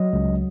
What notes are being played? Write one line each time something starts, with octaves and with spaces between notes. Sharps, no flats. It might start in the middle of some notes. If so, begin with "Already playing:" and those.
Already playing: F#3 D#5
C#2